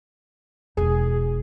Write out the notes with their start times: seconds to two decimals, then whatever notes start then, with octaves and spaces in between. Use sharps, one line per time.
0.77 E1 D#4 G#4